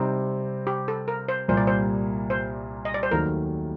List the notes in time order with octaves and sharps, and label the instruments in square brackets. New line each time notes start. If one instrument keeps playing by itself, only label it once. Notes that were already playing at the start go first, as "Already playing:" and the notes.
Already playing: [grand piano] C3 G3 C4 [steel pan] D#4
[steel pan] G4
A4
A#4
C5
[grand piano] C2 A#2 G3 A#3 [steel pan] C5
[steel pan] D5
C5
C5
D#5
D5
C5
[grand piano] D#2 D#3 F#3 A3 [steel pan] A#4